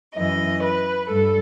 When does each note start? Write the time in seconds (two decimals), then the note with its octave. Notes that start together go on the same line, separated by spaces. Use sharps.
0.15 F#2 E3 D#5
0.63 B4
1.09 G2 A4